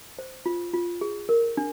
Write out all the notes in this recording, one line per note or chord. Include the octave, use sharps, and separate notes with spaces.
C5
F4
F4
G#4
A#4
D4